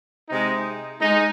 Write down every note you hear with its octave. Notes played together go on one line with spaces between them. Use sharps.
C3 G#3 D#4
G#3 D#4